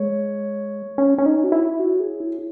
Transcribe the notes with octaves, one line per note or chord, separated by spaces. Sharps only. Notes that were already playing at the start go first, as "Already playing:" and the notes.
Already playing: G#3 C#5
C#4
C#4
D#4
F#4
E4
F#4
G#4
E4